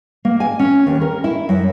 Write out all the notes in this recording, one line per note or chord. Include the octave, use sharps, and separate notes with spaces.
A#3
G#5
C#4
D#2
A#4
E4
F#2